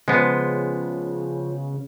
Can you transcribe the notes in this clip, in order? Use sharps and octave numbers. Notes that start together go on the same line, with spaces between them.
C#3 F3 G#3 B3